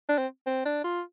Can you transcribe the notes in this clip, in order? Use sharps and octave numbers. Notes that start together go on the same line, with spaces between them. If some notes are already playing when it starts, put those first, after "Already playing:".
D4
C4
C4
D4
F4